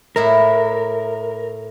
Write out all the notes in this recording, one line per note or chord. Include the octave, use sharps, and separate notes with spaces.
A2 E4 A#4 E5